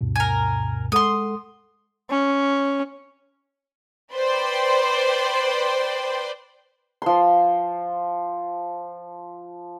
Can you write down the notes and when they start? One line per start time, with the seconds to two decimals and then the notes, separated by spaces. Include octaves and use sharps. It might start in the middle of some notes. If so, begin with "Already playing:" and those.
0.01 D2 G2 B2
0.16 A#4 G#5
0.92 G#3 A4 F#5 C6 D#6
2.10 C#4
4.14 B4 C5 D5 G5 C6
7.02 F3 C6